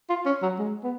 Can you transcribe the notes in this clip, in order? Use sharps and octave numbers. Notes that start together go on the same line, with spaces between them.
F4
C#4
F#3
G#3
B3